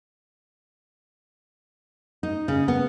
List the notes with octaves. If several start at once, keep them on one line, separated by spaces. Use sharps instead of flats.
D#4
C#3
B3